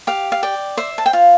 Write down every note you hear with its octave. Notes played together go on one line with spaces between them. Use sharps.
G4 F5
F5
D5 G5
C5 E5
A5
G5
F4 F5